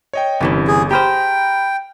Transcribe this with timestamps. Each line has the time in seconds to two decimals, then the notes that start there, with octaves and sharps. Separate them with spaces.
0.13 C#5 D#5 G5
0.41 G1 C3 E3 C#4
0.68 G#4
0.91 G4 G#4 C5 G5 A#5 B5 F6